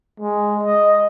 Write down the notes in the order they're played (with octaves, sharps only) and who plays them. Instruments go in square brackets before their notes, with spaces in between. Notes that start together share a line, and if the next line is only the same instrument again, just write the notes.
[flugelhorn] G#3
D#5